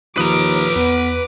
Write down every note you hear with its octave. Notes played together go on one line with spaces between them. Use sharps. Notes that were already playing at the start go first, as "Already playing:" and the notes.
D#2 F3 F4 B4 A#5 D6 D#6
E2 B3